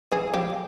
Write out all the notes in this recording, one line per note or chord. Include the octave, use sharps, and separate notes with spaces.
E3 G#4
F3 G4